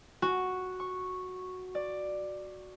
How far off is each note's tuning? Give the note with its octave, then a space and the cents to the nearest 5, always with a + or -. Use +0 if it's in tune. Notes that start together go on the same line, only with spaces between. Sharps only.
F#4 -5
C#6 -5
D5 +10